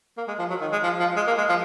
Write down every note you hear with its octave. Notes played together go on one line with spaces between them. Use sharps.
A#3
G#3
F3
F#3
D#3
G#3
F3
F3
G#3
A#3
G#3
F3